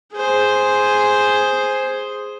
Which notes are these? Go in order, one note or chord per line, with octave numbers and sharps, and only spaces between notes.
G#4 C5